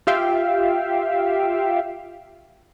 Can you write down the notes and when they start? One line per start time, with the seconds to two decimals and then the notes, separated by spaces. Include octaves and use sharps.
0.07 F4 G4 E5 F5 G5